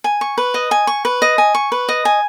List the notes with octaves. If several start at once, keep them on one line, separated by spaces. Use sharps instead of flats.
G#5
C#6
B4
D#5
G#5
C#6
B4
D#5
G#5
C#6
B4
D#5
G#5